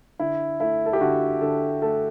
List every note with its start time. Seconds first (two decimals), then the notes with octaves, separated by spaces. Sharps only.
0.19 D3 E4
0.60 A3 E4
0.86 A4
0.93 G4
1.01 D3 F#4
1.41 D3 A4
1.82 A3 A4